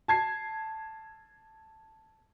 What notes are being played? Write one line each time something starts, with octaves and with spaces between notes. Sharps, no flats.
A5 G#6 C7